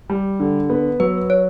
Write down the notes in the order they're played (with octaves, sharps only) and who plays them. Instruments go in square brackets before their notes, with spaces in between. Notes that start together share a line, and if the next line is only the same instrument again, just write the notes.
[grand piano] G3
D3
B3
[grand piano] F#3 [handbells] B4
[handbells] C#5